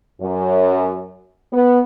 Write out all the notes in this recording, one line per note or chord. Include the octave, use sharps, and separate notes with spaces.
F#2
B3